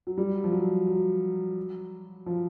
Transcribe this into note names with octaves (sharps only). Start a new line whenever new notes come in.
F#3
G3
F3
F#3
F#3
F3